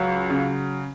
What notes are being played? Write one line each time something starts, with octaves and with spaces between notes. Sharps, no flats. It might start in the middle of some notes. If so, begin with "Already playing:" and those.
Already playing: C#2 F#3
C#3